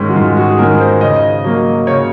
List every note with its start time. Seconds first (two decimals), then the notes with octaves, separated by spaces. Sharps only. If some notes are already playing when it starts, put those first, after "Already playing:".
Already playing: G#2 D#3 G#3 C#4
0.08 F#4
0.15 G#2 F4
0.37 F#4
0.49 G#4
0.58 D#3 G#3 C#4 A#4
0.80 C5
1.01 C#3 D#5
1.44 F#3 A#3
1.87 C#3 C#5